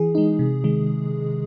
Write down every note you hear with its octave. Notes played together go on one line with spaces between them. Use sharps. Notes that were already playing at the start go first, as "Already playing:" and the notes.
Already playing: E3 G#4
G#3 D#4
C3
D#3 G#3